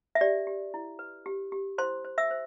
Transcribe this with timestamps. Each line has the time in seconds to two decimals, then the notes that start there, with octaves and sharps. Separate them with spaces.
0.15 E5
0.21 G4 D5
0.47 G4
0.74 E4
0.99 B4
1.26 G4
1.52 G4
1.78 E4 C5 C6
2.04 C5
2.18 E5 E6
2.31 C5